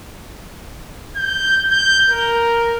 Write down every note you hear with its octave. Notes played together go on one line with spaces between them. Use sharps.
G6
G6
A#4